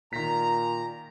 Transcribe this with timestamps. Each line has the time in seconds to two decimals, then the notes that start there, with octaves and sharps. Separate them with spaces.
0.13 A#2 D#3 A#5 B6